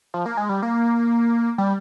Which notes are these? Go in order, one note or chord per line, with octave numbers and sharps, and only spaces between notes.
F3
A#3
G#3
G3
A#3
G3